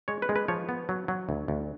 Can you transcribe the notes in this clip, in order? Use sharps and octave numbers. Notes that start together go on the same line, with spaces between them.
G#3 C#5
B4
G#3
B4
F3 C#5
B3
F#3
F#3
D2
D2